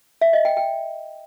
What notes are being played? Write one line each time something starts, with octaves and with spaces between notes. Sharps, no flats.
E5
D#5
G5
G5